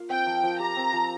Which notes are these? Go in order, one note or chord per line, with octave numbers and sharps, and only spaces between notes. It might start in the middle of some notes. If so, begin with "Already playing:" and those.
Already playing: A#3 F4 F5
C4 G5
F3
F3
G4 A#5
C4
F3